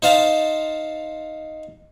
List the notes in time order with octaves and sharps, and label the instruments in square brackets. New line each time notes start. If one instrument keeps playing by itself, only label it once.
[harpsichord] D#4 C5 F5 A5